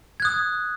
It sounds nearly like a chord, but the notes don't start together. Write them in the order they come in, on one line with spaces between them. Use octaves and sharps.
G#6 F#6 D#6